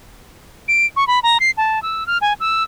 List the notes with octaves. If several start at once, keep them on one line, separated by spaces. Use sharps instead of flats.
D7
C#6
B5
A#5
C7
A5
E6
F6
G#5
E6